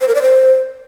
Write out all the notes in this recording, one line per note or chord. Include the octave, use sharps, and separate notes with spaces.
C5
A#4
D5
C5